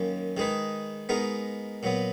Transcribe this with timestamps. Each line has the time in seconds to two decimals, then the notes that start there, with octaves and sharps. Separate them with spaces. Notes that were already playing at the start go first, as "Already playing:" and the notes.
Already playing: F#2 D#3 A#3 C#4
0.37 D#3 G#3 D#4 G#4 B4
1.09 G#3 B3 D#4 A#4
1.83 A#2 F#3 B3